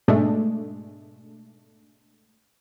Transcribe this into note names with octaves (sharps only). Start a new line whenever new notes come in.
G#2 B2 G#3 A3 D4